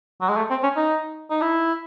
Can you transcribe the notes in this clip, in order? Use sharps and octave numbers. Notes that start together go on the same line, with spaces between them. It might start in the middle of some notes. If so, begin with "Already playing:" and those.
F#3
G#3
A3
C4
C#4
D#4
D#4
E4